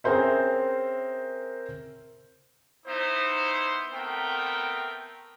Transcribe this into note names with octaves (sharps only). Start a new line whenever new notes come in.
C4 C#4 G#4 A#4 C5 E5
B3 D#4 E4 C5
A3 B3 C4 A#4 G5